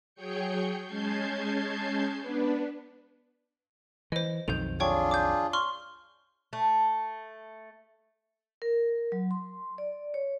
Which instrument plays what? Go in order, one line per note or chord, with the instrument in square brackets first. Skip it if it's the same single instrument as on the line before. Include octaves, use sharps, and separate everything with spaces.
[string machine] F#3 G#4 C#5 G5 G6 C#7
G#3 C#4 A5 G6 G#6 C7
B3 D4 B4
[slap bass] E3 [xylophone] C5 D#5
[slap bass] B1 F2 D#3 [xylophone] G6 F7
[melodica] D4 F4 G#4 [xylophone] C#5 G5 C#6
[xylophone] D6 G6
C6 C#6 F6
[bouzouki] A3
[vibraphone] A#4
F#3
C6
D5
C#5